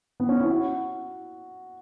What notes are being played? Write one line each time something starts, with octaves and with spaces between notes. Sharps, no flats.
B3
C#4
E4
F#4